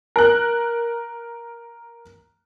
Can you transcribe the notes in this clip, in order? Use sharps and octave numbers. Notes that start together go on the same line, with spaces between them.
A#4 F#6